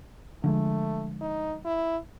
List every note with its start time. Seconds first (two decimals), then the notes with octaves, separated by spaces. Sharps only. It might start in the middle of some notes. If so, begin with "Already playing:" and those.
0.44 D3 F3 G#3 A3
1.21 D#4
1.65 E4